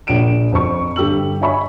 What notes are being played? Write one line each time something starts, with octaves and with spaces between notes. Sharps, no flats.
A#1 C#5 D7 E7
F2 C5 C#6
G2 D3 G4 A4 E6 F#7
C#5 D#5 E5 G#5 B5 C#6